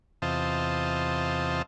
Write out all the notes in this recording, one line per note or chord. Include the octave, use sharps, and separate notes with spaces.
E2 C3 F4 C5 D#5 A5